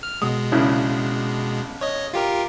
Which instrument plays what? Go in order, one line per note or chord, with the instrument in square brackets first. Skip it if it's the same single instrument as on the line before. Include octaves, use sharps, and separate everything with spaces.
[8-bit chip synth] F6
[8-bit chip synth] B2 G#3 [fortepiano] D#6
[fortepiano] A#1 C#3 E4
[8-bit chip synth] C#5 D#5
F4 G4 A#4